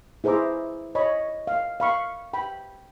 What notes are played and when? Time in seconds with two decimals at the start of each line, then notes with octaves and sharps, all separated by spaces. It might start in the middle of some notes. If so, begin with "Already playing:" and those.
0.24 E4 G#4 C5 E5 A#5 D6
0.95 C#5 D#5 B5
1.47 F5
1.80 F5 B5 C#6
2.33 G5 B5